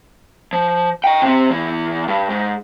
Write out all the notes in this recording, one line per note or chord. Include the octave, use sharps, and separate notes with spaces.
F3
D#5 G5
C3 C4
E2 E3
G2
G#2